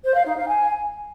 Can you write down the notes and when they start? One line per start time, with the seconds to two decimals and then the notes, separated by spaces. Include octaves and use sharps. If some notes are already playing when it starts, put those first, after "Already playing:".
0.04 C5
0.15 F5
0.25 D#4
0.36 F5
0.47 G#5